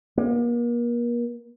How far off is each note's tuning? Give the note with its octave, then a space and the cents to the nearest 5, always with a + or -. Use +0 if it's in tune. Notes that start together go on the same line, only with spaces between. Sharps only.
A#3 +40